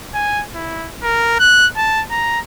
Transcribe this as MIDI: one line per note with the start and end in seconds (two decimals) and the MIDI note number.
0.14 0.43 80
0.55 0.89 64
1.03 1.38 70
1.40 1.67 90
1.77 2.02 81
2.11 2.40 82